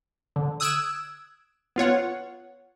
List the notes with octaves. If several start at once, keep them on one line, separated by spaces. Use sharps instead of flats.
D3
D#6 E6 F#6 G#6 D7 E7
B3 F4 C#5 F#5